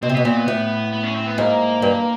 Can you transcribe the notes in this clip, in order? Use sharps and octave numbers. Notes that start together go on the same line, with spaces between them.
B2 C4
C3
B2 B3
A#2 C4
B3
A2
B3
C#4
C4
B3
G#2 A#3
G2